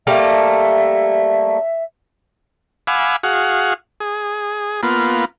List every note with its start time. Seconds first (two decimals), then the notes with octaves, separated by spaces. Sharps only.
0.07 G3 A3 A#3 E5
2.87 F5 F#5 G#5 B5 D6 E6
3.23 F#4 G#4 F5 F#5
4.00 G#4
4.83 A#3 B3 F4